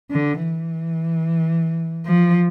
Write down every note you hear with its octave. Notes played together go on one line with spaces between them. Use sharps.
D3
E3
F3